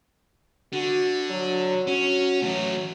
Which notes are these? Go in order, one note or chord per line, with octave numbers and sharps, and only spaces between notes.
D3 F#4
F#3
C#4 F#4
E3 F#3 A3